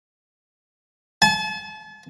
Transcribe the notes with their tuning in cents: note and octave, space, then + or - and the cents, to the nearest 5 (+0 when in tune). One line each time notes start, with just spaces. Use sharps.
A5 -40